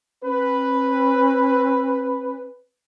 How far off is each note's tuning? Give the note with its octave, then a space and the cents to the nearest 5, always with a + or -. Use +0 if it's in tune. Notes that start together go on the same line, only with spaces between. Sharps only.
C4 +45 B4 +0